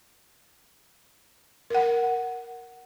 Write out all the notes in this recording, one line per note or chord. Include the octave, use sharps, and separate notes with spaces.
A#4 F#5